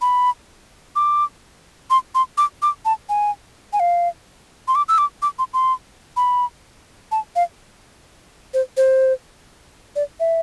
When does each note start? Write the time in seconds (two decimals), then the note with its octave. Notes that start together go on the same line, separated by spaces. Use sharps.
0.01 B5
0.96 D6
1.90 C6
2.15 C6
2.38 D6
2.62 D6
2.85 A5
3.09 G#5
3.73 G#5
3.80 F5
4.68 C6
4.75 D6
4.89 E6
4.98 D6
5.22 D6
5.39 C6
5.54 C6
6.17 B5
7.12 A5
7.36 F5
8.54 C5
8.77 C5
9.96 D5
10.20 E5